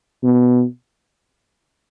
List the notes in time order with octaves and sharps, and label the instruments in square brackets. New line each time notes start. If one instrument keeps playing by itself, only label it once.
[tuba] B2